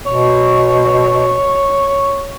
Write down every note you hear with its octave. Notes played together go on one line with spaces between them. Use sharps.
B2 C#5